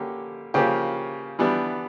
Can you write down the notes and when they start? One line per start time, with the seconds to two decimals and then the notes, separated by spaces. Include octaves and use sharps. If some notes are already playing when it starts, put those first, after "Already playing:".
Already playing: D3 G3 A#3 C#4 G4
0.54 C#3 F3 A#3 G4
1.39 E3 G3 B3 D4